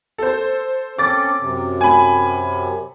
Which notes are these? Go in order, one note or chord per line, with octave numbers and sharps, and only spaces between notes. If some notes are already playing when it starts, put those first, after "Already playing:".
A4 C5
C4 C#4 A4 D6 A6
F#2 C3
G#5 B5